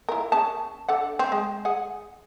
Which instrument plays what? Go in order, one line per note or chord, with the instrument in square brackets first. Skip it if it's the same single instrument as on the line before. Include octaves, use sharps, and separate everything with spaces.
[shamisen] E4 F4 A#4
C#4 G#4 A5
D4 A4 F#5
C4
G#3
G#4 F#5